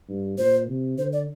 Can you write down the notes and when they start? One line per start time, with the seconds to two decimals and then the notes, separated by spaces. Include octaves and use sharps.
0.09 G2
0.38 A#2 C5
0.68 C3
0.98 D3 C5
1.13 D5